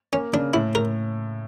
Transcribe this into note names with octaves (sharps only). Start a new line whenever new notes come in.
A#3 C#4
C#3 D4
A2 E4
A2 A#4